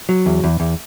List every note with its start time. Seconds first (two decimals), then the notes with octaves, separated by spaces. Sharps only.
0.09 F#3
0.26 E2
0.44 E2
0.60 E2